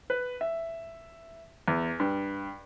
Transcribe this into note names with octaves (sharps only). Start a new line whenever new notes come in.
B4
E5
E2
G2